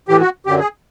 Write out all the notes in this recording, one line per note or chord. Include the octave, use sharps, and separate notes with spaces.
A2 E3 G4
F#4
F#2 D3 F#3 G4
G#4